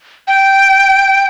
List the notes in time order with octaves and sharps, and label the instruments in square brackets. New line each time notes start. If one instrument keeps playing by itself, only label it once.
[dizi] G5